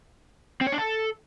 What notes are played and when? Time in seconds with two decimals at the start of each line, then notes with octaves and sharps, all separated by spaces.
0.61 C4
0.67 C#5
0.72 D4
0.78 A4